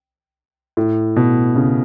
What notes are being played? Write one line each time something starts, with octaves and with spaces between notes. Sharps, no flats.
A2
B2
C#3